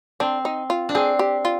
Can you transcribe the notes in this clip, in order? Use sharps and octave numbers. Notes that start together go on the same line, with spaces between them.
C4 D4
D#4
F4
D4
C4 G#4
G4
F4